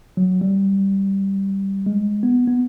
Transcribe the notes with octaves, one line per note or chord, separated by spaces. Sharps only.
F#3
G3
G#3
B3
B3